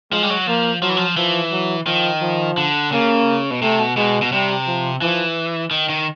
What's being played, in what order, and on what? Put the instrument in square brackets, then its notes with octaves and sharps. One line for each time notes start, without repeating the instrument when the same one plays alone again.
[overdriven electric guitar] F3 [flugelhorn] G#3
[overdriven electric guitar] G3
F#3
[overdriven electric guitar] F3 [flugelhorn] A#3
[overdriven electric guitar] F3 [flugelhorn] F#3
[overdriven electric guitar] E3
F3
[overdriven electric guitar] E3 [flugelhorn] F3
[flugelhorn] F#3
[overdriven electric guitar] D#3 [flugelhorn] F3
[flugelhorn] F3
[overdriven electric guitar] D3
[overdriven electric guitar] C#3 [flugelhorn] A#3
[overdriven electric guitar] B2
[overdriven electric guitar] C3 [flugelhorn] A3
[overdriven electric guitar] B2
[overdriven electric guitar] B2 [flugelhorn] G#3
[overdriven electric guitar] B2
[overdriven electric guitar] C3 [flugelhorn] G3
[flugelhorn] F3
[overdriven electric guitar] E3 [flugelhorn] F3
[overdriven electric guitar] D#3
D#3